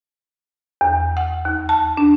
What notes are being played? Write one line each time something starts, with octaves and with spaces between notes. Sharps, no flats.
E2
F#5
D#2
A5
D4